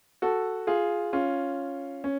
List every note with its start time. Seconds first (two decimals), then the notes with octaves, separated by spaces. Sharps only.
0.22 F#4 A4
0.67 F4 G#4
1.13 C#4 F4
2.04 C#4